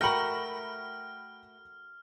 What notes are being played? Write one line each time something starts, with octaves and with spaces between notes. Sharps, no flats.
A3 F#4 A#4 G5 B5 F6 A#6 F#7